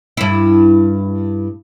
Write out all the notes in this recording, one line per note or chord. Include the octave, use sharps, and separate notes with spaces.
G2 E4